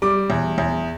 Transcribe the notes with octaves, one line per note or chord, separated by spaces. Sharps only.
G3 D6
E2
E2